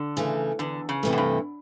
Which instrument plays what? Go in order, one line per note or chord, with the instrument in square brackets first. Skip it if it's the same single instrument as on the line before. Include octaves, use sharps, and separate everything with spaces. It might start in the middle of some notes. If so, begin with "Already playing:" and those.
Already playing: [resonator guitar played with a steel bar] D3
[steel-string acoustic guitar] C#3 E3 A3
[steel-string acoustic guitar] E2 [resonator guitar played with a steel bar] D3
[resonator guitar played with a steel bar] C#3
[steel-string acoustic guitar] C3 E3 A3
[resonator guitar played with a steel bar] F#2
G2